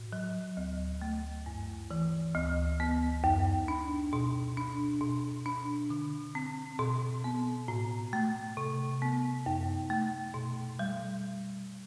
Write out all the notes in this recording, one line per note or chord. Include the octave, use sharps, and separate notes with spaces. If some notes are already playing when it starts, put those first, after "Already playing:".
Already playing: A2
F#3
D2
A3
G2
E3
D2
B3
F#2
D4
B2
D4
B2
D4
D3
C4
B2
B3
A2
A3
C3
B3
F#2
A3
B2
G3